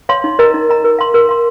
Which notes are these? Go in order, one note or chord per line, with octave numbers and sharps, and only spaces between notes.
C#5 F5 C6
D#4
A#4 D#5 A#5
D#4
A#4 D#5 A#5
A#4
F5 C6
A#4
F5 C6